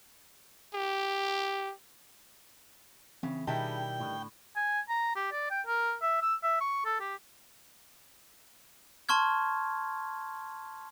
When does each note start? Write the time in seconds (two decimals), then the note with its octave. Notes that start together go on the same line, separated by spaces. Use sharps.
0.74 G4
3.23 C#3 E3 C4
3.47 B2 D#3 G3 D4 E4 G#4 G5 A5
4.00 A2 D3
4.56 G#5
4.89 A#5
5.16 G4
5.32 D5
5.51 G5
5.66 A#4
6.02 E5
6.22 E6
6.43 E5
6.61 C#6
6.85 A4
7.00 G4
9.09 A5 C6 C#6 F6 G#6